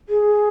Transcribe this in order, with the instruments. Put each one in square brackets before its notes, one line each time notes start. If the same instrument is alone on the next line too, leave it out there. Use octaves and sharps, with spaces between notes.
[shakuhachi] G#4